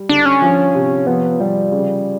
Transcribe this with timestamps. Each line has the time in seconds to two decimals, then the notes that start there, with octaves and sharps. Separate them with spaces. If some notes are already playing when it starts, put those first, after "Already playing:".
Already playing: G3
0.09 D3 D4
0.25 C#4
0.42 F3
0.75 C3
1.07 F3 B3
1.40 F3 G3
1.72 C#3